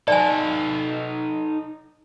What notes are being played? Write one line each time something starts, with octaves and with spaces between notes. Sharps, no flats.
D#4 A4 D5 G#5